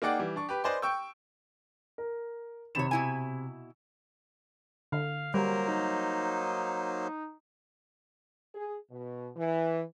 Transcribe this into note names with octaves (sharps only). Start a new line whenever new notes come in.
A#3 D#4 G#4 D5 F#5 G5
E3 G3
D4 C#6
G4 B4
B4 C5 D5 D#5 G#5 C6
G5 C#6 E6 G6
A#4
C3 D#3 C#5 B5 E7
B2 E4 G#5
D3 F5
F#3 G3 A#3 A#4 C5
D#4
G#4
B2
E3